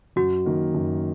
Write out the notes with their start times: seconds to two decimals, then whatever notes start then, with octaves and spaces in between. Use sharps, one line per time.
0.16 F#2 F#4
0.46 D#3 A#3
0.74 F#2